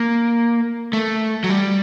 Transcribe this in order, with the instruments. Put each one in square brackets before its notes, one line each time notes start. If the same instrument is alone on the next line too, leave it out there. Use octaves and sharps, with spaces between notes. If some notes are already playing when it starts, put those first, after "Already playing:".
Already playing: [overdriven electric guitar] A#3
A3
F#3
G3